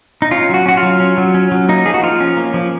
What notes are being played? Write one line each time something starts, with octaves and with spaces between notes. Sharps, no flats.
D#4
C#4 F4
F#3 F#4
C#4 F#4
F4
F#3
C#4
F#3
C#4
F#3
A#3 D#4
F3 G#4
F#4
F3 F4
C#4
A#3
F3